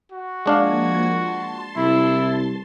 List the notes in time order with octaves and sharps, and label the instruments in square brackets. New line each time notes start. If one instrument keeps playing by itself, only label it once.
[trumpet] F#4
[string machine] F3 A#3 G#6 [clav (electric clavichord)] G#3 D4 F5
[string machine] A5 C6
[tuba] C2 [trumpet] E4